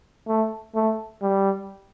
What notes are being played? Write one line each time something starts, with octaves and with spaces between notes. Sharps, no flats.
A3
A3
G3